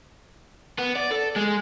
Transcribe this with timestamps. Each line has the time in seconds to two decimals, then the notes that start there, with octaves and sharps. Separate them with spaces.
0.78 B3
0.95 D5
1.11 A4
1.36 G#3